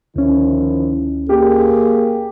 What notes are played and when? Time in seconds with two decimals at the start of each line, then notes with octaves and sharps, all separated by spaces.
0.16 D2 D#3 F3 C#4 E4
1.29 A#3 G4 G#4